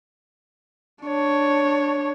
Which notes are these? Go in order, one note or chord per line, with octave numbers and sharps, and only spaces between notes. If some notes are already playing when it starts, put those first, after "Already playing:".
D4 C#5